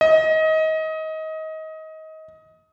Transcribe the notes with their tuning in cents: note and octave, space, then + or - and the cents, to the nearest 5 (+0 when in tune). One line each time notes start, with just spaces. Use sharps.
D#5 +25